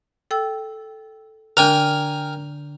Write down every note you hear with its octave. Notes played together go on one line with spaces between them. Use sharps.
A4 G5 E6
D3 D4 A#4 G5 G#5